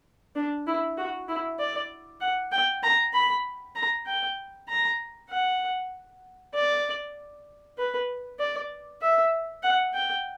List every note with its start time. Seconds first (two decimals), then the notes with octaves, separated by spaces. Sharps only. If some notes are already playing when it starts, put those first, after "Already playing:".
0.35 D4
0.67 E4
0.97 F#4
1.28 E4
1.59 D5
2.21 F#5
2.52 G5
2.83 A#5
3.13 B5
3.76 A#5
4.06 G5
4.68 A#5
5.30 F#5
6.55 D5
7.78 B4
8.39 D5
9.02 E5
9.63 F#5
9.93 G5